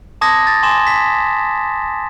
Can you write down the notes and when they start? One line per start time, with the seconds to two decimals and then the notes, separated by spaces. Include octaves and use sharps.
0.21 A5 C6 D6 D#6 G#6 A#6
0.47 A6
0.63 G#5 C6 D6 E7
0.87 B6